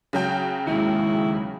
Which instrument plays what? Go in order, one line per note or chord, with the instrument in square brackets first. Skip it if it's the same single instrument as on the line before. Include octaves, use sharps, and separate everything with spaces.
[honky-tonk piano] C#3 F#3 G5
[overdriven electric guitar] D#2 G#3 [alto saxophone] E4